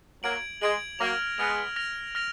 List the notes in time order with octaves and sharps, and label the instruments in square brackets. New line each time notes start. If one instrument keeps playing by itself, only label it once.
[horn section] F#3 A#3 [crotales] G#6 D7 F#7
[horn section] G#3 [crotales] G#6 D7 F#7
[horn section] F#3 A#3 [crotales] F6 A#6 F7
[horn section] G#3 B3 [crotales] F6 A#6 F7
[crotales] F6 A#6 F7
F6 A#6 F7